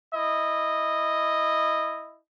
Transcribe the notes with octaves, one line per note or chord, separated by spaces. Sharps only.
E4 D#5